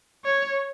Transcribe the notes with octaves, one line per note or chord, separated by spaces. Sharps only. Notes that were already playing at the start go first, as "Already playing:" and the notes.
C#5